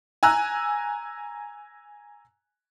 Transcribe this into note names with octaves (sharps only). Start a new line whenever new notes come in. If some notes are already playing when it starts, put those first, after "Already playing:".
G#5 A#5 E6 F#6